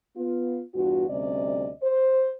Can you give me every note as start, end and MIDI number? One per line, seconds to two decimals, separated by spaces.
0.17 0.61 59
0.17 0.61 65
0.74 1.08 40
0.74 1.08 43
0.74 1.08 65
0.74 1.08 66
1.09 1.70 38
1.09 1.70 48
1.09 1.70 55
1.09 1.70 61
1.09 1.70 74
1.09 1.70 75
1.82 2.31 72